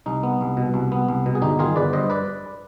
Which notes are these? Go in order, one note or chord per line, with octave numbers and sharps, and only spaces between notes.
C2 D#4
B3
C2
B2
C2
B3
C2
B2
G#4
G1 D#4 G4
D#3 F4 G#4
G1 B4 D5
G2 C5 D#5
B4 D5